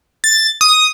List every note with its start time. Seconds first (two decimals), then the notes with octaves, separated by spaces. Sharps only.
0.24 A6
0.61 D#6